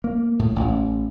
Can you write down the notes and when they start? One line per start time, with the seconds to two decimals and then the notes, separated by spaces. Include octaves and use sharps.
0.04 A#3
0.39 A2
0.56 A1